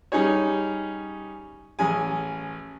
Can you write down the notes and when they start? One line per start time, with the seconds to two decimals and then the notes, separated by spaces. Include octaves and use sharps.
0.12 G3 C#4 D#4 G#4 C#5
1.79 A1 C#4 G#4 G#5